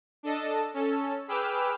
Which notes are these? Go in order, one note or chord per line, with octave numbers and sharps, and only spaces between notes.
D4 A4 D#5 A5
C#4 A4
G#4 B4 G5 D6 E6 F6